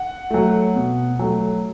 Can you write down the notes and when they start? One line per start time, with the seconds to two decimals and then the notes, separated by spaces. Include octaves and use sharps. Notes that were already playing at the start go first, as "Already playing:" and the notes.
Already playing: F#5
0.31 F#3 A3
0.75 B2
1.19 F#3 A3